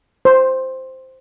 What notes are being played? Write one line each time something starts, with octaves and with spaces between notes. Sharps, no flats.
C5